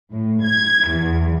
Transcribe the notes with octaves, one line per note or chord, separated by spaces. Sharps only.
A2
G#6
E2